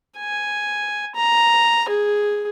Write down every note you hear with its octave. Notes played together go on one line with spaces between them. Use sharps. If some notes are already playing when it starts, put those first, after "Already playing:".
G#5
A#5
G#4